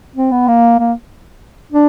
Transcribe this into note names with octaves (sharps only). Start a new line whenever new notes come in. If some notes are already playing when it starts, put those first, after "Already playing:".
C4
B3
A#3
A#3
D4